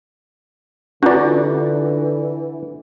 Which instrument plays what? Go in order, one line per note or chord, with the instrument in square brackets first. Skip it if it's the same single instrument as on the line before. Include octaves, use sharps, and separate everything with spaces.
[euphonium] D3 [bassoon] E3 [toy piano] D4 F4 [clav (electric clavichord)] F#4 D5